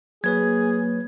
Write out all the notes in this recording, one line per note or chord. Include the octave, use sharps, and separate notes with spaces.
F#3 A#3 G#4 B4 C#5 G#6